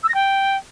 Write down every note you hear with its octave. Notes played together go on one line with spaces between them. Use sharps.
E6
A#6
G5